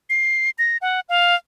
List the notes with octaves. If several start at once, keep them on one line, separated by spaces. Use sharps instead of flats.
C7
A#6
F#5
F5